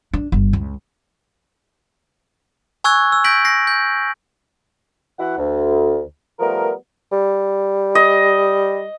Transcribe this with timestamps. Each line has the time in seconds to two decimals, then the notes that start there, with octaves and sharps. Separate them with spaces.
0.13 D4
0.32 G1
0.53 C#2
2.84 G#5 C#6 E6 F#6 G#6
3.12 E6
3.24 G6 A#6 B6 D7 F#7
3.45 A#6 C7
3.67 G6
5.19 E3 E4 F#4 F#5
5.38 D2
6.39 F3 G3 A3 B3 A#4
7.12 G3
7.95 D#5